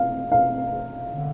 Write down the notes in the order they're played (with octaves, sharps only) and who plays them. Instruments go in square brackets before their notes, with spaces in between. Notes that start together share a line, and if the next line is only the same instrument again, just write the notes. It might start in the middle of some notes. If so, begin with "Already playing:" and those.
Already playing: [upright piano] F5
F5
[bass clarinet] D3